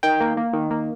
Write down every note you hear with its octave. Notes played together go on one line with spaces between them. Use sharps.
D#3 G5
A#3
A#3
D#3
A#3